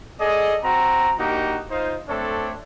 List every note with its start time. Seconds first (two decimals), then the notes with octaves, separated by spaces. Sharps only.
0.20 G#4 A4 D5 D#5
0.63 C4 F#4 A#5
1.19 A#3 D4 D#4 F#4 G4
1.70 D#4 F4 C5
2.08 A3 C4 D4 A4 C#5